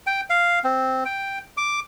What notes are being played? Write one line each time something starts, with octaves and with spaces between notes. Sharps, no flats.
G5
F5
C4
G5
D6